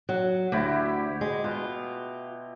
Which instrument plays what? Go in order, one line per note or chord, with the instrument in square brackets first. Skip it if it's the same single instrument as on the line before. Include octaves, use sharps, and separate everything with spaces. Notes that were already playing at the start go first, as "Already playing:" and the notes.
[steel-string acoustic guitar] F#3
[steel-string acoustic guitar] D2 [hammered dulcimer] E4 F#4 G4
[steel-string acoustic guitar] G#3
[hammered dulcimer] B2 [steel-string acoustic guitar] F4